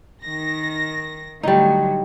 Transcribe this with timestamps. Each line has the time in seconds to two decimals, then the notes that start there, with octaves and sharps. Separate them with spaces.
0.24 D#3 A#6
1.43 A2 D3 F#3 G3 D#4